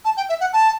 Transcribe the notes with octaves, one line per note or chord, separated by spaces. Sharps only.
A5
G5
E5
F#5
A5